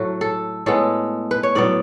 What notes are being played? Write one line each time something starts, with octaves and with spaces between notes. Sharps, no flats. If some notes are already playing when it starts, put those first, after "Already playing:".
Already playing: A2 F#3 A3 F#4
A4
A2 G#3 B3 A4
B4
C#5
A2 F#3 B3 D5